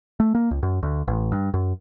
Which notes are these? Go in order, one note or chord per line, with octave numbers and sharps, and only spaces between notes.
A3
A#3
C#2
F#2
D2
A1
G2
F#2